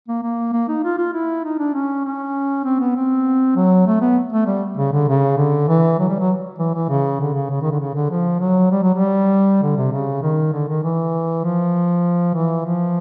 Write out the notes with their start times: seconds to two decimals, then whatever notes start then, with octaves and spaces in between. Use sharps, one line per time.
0.08 A#3
0.23 A#3
0.53 A#3
0.68 D#4
0.84 F4
0.98 F4
1.13 E4
1.45 D#4
1.59 D4
1.74 C#4
2.05 C#4
2.65 C4
2.80 B3
2.96 C4
3.56 F#3
3.87 A3
4.01 B3
4.33 A3
4.47 G3
4.77 C#3
4.92 D3
5.08 C#3
5.37 D3
5.69 E3
5.99 F#3
6.09 G3
6.19 F#3
6.59 E3
6.74 E3
6.89 C#3
7.20 D3
7.35 C#3
7.50 C#3
7.62 D#3
7.71 D3
7.81 C#3
7.95 D3
8.11 F3
8.40 F#3
8.71 G3
8.83 F#3
8.94 G3
9.63 D3
9.77 C3
9.93 C#3
10.23 D#3
10.53 D3
10.69 D#3
10.84 E3
11.44 F3
12.34 E3
12.66 F3